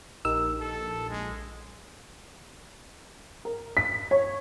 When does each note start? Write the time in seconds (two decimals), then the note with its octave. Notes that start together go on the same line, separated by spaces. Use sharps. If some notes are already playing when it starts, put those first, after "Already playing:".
0.25 A#1 D#4 G4 A#4 E6
0.60 A4
1.10 A#1 G#3
3.45 A#4
3.77 B6
4.11 C#5